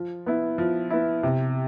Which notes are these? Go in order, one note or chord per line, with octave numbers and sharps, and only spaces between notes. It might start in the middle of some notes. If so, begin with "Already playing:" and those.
Already playing: F3
B3 E4
F3
B3 E4
C3